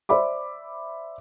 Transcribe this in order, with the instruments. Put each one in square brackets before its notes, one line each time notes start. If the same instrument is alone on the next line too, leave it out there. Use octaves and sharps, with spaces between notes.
[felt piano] C5 D5 E5 B5 D6